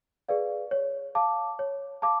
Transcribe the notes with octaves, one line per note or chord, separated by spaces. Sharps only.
G#4 B4 D5 F5
C#5
F5 A5 D6
C#5
F5 A5 D6